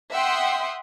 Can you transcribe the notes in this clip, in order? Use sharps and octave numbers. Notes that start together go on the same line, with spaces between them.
E5 F#5 G5 C6 D#6